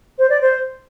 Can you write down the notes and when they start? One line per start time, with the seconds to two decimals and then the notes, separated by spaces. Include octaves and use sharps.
0.18 C5
0.29 D5
0.41 C5